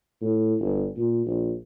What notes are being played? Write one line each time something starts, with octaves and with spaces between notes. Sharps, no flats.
A2
G1
A#2
A#1